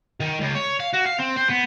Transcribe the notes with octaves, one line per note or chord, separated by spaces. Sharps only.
D#3
C#2
C#5
F5
F#4
F5
C4
C5
B3